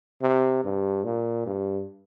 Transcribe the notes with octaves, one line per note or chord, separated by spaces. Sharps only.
C3
G2
A#2
G2